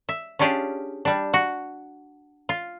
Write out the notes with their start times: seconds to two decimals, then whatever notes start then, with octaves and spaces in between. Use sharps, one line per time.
0.09 E5
0.39 C#4 D4 F4 G4 G#4
1.05 G3 D4
1.34 F#4
2.49 F4